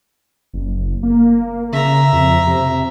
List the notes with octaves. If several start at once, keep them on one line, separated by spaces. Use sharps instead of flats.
F#1
A#3
C#3 E5 A#5
F2
C3